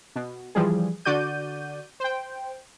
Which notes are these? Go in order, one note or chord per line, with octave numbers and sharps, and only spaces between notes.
B2
E3 F3 G3 G#4
D3 F#4 D5 G6 D#7
C5 G5